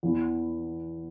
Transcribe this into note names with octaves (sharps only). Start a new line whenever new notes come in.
E2 E3 B3